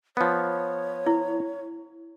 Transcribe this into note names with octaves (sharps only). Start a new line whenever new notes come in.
F3 B3 C#5
E4